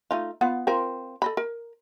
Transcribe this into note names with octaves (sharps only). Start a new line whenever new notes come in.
A3 D#4 F4
B3 F4 F#5
C4 F4 A#4
A4 D#5 B5
A#4